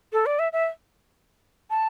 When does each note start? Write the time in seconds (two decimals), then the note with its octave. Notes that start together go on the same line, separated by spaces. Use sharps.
0.13 A4
0.26 D5
0.39 E5
0.53 E5
1.70 A5